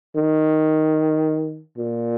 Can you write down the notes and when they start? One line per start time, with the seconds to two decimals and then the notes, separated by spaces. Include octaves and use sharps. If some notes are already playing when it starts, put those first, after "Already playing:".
0.16 D#3
1.78 A#2